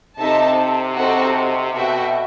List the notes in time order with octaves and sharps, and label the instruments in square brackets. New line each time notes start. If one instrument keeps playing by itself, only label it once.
[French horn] C3 [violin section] C4 D#4 A4 E5 A5
[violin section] C4 D#4 F#4 A4
[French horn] B2 [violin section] F#4 A4 E5 G5